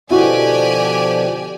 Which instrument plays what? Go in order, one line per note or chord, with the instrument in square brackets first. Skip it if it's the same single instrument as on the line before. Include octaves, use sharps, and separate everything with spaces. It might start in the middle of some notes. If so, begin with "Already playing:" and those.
[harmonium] B2 D3 F3 [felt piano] E4 F#4 [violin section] G4 D5 G#5